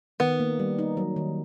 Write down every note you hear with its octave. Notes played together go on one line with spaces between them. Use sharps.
D#3 B3
A#3
G3
D#4
F#3
D#3